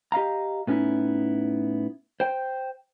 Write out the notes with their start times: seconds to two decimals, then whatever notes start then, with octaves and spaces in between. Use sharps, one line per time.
0.12 G4 D#5 F5 A#5
0.67 A2 B3 C#4 D#4 E4
2.20 C5 G5